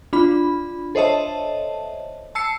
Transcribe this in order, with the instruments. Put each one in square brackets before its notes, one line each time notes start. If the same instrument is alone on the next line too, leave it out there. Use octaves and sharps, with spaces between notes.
[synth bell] D4 F4 B5
A4 C5 C#5 D#5 E5 A5
A5 E6 C7 C#7